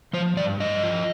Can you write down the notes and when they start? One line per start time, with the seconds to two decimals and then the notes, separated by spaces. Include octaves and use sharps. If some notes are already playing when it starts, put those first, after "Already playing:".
0.13 F3 C5
0.37 G2 D5
0.60 G2 D#5
0.83 F3